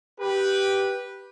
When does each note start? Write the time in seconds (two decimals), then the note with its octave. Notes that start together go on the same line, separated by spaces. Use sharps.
0.19 G4 B4